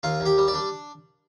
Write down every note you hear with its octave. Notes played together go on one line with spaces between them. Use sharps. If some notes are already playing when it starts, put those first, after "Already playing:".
D#2 F4
D#2
G4
G3
D5
D4